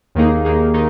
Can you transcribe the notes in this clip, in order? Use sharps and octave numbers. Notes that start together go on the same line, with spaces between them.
D#2 D#3 A#3 D#4 G#4
D#2 D#3 A#3 D#4 G#4
D#3 D#4